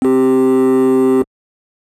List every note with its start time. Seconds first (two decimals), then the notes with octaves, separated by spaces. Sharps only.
0.02 C4 G4